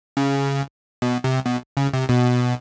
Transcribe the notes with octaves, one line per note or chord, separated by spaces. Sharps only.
C#3
B2
C3
B2
C#3
C3
B2